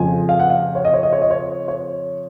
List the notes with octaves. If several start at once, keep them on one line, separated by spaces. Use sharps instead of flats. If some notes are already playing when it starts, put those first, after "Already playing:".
Already playing: F2 C#3 F3 G#5
F5
F#5
F5
C#5
D#5
C#5
D#5
C#5
D#5
C#5
C#5